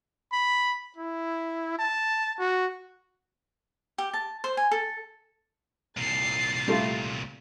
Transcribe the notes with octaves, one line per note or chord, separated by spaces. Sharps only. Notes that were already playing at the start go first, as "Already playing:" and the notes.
B5
E4
A5
F#4
G4
A5
C5
G#5
A4
C2 A#2 A6 C7
G3 A3 F4